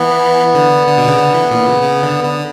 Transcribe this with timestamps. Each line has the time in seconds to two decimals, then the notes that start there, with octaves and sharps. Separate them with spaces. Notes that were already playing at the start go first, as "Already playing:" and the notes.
Already playing: E3 B3
0.55 D3
0.87 D3
0.98 B2
1.08 C#3
1.18 D3
1.34 E3
1.51 A#2
1.66 C#3
1.82 C#3
2.03 D3
2.24 D3